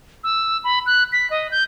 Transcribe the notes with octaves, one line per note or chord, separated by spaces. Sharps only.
E6
B5
F#6
B6
D#5
G6